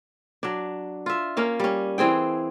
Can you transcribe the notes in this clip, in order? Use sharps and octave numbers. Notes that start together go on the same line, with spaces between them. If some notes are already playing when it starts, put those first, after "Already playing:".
F#3 D4
F4 E5
A#3 C#4 F5
G3 C#4
E3 C4 G#4 G5